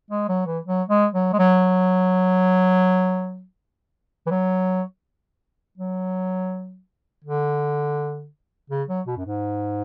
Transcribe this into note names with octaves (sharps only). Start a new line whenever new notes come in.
G#3
F#3
E3
F#3
G#3
F#3
G#3
F#3
E3
F#3
F#3
D3
C#3
F#3
B2
F#2
G#2